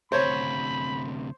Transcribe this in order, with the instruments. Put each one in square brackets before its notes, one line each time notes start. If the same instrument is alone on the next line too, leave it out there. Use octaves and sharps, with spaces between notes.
[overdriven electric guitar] D2 C3 [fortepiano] C5 C#5 [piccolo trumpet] B5